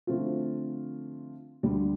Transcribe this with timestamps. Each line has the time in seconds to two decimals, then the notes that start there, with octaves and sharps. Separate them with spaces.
0.07 D3 F3 A3 C4 F4
1.63 D2 D3 G3